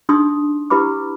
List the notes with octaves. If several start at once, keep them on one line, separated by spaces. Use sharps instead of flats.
D4 D#4 G#4 C6 D#6
E4 G4 B4 B5 D6